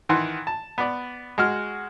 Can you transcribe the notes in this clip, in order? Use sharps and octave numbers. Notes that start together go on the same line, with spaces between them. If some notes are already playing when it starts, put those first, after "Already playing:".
D#3 E3 F#5 C6
A5
B3 D5
G#3 F#4 F6